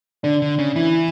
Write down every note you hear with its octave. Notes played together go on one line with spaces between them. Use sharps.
D3 D4
D3
C#3
E3 E4